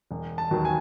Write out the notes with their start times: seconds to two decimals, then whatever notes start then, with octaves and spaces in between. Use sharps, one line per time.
0.11 E1
0.38 A5
0.51 D#2 D#3 F#3
0.65 G#5